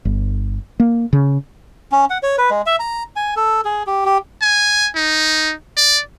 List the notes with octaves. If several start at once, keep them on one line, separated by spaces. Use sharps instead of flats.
G1
A#3
C#3
C#4
F#5
C#5
B4
G#3
E5
A#5
G#5
A4
G#4
G4
G4
G#5
D#4
D5